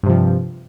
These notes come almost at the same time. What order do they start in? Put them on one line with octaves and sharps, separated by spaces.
G2 C3 F3